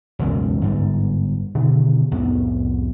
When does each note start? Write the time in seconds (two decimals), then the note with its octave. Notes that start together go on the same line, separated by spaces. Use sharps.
0.19 E1 C#2 F#2
0.61 G1 G#2
1.55 B2 D3 D#3
2.11 C2 F2 A2 B3